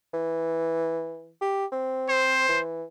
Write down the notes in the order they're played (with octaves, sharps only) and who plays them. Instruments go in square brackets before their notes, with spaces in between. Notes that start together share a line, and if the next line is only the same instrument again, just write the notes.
[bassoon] E3
G4
C4
[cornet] C5
[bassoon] E3